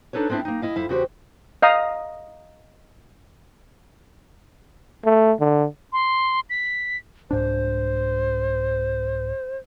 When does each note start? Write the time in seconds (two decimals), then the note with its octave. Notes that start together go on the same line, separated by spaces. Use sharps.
0.13 D4 D#4 A4 B4 C#5
0.29 G#3 B3 C4 D4 E4
0.45 A#3 D#4
0.62 E4 D#5 F5
0.76 F2 E4 F5
0.89 E2 C#3 F#4 G4 C5
1.62 D#5 F5 A#5 D#6
5.05 A3
5.40 D3
5.93 C6
6.50 B6
7.31 C2 G#2 D4 C5